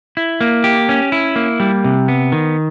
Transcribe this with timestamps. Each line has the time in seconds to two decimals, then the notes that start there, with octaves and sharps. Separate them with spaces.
0.17 E4
0.41 A#3
0.64 G4
0.89 C#4
1.12 E4
1.36 A#3
1.60 G3
1.84 C3
2.08 B3
2.32 D#3